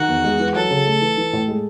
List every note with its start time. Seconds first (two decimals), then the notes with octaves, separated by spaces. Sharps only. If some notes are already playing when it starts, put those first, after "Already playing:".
Already playing: D#3 F#4
0.09 E2
0.24 G#3
0.40 E3
0.55 F#3 A4
0.71 C#3
0.86 A3
1.02 E3
1.18 E3
1.33 A2
1.48 G#3